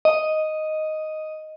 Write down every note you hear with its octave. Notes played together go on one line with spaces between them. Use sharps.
D#5